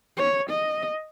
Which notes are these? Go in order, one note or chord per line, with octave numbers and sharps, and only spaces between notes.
C#5
D#5